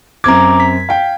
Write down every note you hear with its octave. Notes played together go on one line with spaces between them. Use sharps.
F#2 C4 A#5 D6 G#6
B6
F5 G5